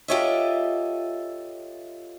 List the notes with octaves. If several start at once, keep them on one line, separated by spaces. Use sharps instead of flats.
F4 G4 A4 C#5 D#5 E5